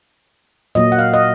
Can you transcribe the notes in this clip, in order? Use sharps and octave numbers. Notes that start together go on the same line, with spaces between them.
A#2 F#3 A#3 D#5
F#5
F5
D#5